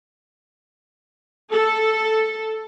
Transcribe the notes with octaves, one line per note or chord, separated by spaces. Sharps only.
A4